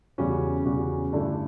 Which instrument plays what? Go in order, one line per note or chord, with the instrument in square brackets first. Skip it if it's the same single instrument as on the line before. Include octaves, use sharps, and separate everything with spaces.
[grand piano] E2 C#3 G3 C#4 F#4
E2 C#3 G3 C#4 F#4
G2 D3 A3 E4